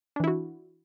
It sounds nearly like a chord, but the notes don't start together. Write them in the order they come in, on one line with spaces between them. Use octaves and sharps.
D4 E3 E4 F#4